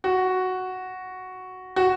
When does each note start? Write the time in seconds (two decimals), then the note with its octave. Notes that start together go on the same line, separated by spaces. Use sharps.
0.04 F#4
1.76 F#4